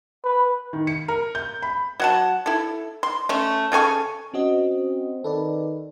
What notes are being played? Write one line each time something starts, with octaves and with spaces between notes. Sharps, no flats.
B4
D#3
C#7
A#4
G6
B5
F#3 F#5 A5
E4 A4
C6
A3 C#4
C#3 A4 G#5 C#6
C4 C#4 F#4 D#5
D#3 A4 B4 D5